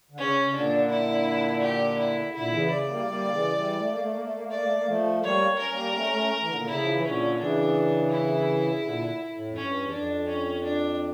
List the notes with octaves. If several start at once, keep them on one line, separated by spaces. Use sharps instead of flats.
D3
C#3 C#4
C#3
A#2 D3 D4
E4
G4
E4
C#3
A#2 D3 E4
C#3 E3
C#3 D5
G3 A#3
G3 A#3
D3
C#3 E3
E3 G3
A3
A#3
A3
A#3
A3
A#3
A3
A#3 D5
A3
A#3
F3 A3
G3 A#3 C#5
C#4 A#4
G3 A#3
A#3
A3 C#4
A3 C#4
E3
A#2 D3
D3
C#3 E4
F3
E3
A#2 D3 C#4
C#3 E3 D4
E4
C#3
A#2 D3
A2
F2
G2 C#4
E2
F2 D4
C#4
D4